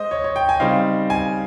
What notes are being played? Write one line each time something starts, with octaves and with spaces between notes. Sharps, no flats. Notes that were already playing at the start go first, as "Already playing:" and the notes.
Already playing: G#3 C5 D#5
C#5
C#5
G5
G#5
C#3 G3 C4 D#4 F5
G#5